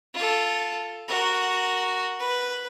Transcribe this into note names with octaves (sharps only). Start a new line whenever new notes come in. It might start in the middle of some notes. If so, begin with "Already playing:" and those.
F4 A4
F#4 A#4
B4